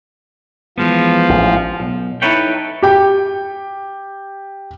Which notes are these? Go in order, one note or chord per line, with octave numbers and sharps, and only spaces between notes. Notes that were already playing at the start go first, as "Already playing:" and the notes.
E3 F3 G#3 B3
A1
B1
D#4 E4 A4 B4 C#5 G5
G4 G5